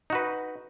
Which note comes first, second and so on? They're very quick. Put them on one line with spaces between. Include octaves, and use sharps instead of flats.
D#4 F#4 B4